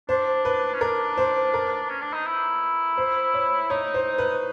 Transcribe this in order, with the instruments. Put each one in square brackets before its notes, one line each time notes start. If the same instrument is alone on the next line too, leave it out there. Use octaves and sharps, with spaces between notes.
[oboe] D4 [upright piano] C5
[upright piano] B4
[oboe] C#4
[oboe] D4 [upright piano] A#4
[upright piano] C5
A#4
[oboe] C#4
D4
D#4
E4
[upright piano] C5
C#5
[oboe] D#4 [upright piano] C#5
[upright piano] C5
B4